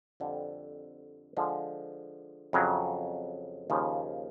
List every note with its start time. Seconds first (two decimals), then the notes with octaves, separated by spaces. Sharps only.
0.20 F2 D3 G3 C4
1.37 D3 F3 G#3
2.53 F2 C#3 F#3
3.70 D#2 C#3 F3